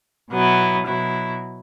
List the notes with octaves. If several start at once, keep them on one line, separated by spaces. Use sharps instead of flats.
B2 F#3 B3 E4
B2 F#3 E4